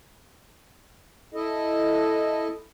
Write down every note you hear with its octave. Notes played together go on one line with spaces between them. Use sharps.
E4 A4 D#5